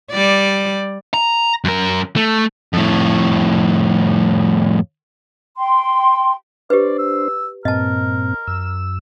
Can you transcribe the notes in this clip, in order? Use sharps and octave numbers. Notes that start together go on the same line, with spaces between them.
G3 D5
A#5
F#2 A#4
A3
F2 A2
G5 C6
D4 G4 B4 C5 D5
E6
G2 A#2 C4 A#4 D#5 A5
F#2 E6